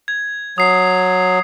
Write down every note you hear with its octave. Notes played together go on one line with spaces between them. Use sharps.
G#6
F#3 D#6 C7